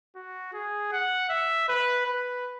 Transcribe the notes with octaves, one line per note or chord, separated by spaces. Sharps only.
F#4
G#4
F#5
E5
B4
B4